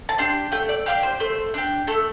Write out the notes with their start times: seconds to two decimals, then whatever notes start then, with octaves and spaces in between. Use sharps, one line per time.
0.09 A5
0.18 D4 G4 C6
0.52 A3 G5
0.69 D5
0.86 D4 G4 F5
1.03 C5
1.20 A3 C5
1.54 D4 G4
1.87 A3 A4